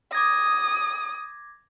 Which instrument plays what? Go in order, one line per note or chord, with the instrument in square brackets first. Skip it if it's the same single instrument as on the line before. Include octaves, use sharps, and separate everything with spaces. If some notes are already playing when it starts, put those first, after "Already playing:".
[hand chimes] D6 G#6 A#6 [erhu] D#6